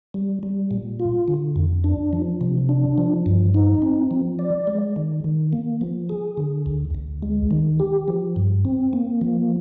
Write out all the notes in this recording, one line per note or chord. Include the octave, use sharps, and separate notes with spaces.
G3
G3
A#2
F4
D3
F2
D4
F3
C3
D4
F3
G2
D#4
C4
F3
D5
G#3
D#3
D#3
A#3
F3
G#4
D3
D2
D2
G#3
D#3
G4
F3
G2
C4
A#3
F3